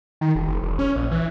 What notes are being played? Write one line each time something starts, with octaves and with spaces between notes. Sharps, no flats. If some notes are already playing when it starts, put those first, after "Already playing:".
D#3
E1
F#1
E1
C#4
A#1
E3